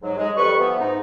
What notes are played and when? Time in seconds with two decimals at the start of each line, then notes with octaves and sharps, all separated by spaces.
0.02 G#2 F#3
0.17 G#3
0.36 F2 G3 B4 C#6
0.58 E3 F3 B3
0.78 G#2 D#4